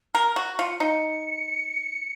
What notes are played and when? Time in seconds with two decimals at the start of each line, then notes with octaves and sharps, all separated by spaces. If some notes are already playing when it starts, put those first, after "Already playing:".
0.14 A#4 F6
0.36 F#4 F#6
0.58 F4 C#7
0.80 D#4 C#7